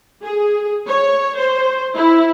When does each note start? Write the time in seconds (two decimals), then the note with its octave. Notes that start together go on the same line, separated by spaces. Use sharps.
0.23 G#4
0.88 C#5
1.38 C5
1.96 E4